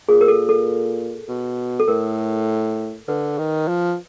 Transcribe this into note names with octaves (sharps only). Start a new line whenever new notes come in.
A#2 G#4
A#4
A4
A4
B2
A4
A2 A#4
D3 B4
D#3
F3